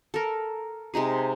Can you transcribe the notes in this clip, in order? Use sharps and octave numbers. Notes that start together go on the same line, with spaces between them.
A4 A#4
C3 G#3 D#4 G#4